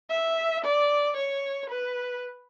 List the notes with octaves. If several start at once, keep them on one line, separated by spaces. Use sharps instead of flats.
E5
D5
C#5
B4